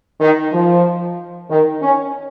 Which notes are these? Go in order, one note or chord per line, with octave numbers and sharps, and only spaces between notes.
D#3
F3
D#3
C#4